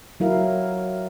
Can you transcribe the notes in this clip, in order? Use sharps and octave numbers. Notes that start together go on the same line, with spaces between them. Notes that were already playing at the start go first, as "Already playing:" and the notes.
F#3 E4 A#4 F5